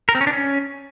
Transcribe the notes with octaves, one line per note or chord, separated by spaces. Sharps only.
A#4
C4
C#4
D4
C#4